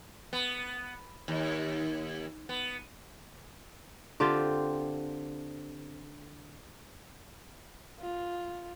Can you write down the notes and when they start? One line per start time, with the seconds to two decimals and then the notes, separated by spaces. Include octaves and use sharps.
0.33 B3
1.28 D#2
2.49 B3
4.20 D3 C4 F4 G4
8.00 F4